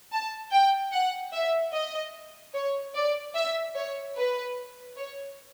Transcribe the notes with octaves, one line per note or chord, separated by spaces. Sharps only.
A5
G5
F#5
E5
D#5
C#5
D5
E5
C#5
B4
C#5